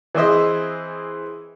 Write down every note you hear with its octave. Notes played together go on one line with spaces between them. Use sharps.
E3 C4 G#4 C5 D#5 E5